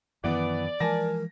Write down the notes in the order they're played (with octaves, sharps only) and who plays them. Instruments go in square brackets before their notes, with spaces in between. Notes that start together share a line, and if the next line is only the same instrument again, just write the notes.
[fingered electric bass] F#2 D#3 [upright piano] E3 B3 [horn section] D5
[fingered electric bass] E3 F3 G#3 [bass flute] A#4 [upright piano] G#5 A5 A#6